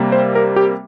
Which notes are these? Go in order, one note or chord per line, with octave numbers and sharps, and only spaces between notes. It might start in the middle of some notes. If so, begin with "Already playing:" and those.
Already playing: C3 G3 A#3
C5
A#4
G4